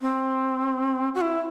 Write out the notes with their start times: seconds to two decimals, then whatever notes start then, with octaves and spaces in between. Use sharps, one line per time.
0.01 C4
1.15 F#4
1.21 E4